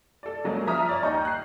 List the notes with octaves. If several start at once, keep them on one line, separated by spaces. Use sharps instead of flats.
A4 D5
C#3 F#3 G#3 A#3
F3 E5 A#5 D#6 F6
C#5 D5
D#2 D#4 A#5 C#6 G6
F#6 C7